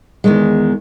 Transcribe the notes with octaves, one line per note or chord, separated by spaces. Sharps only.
E2 D#3 G#3